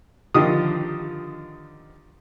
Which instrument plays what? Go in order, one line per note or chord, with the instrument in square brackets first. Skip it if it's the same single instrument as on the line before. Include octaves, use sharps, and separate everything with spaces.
[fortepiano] D3 D#3 F3 G4 D#6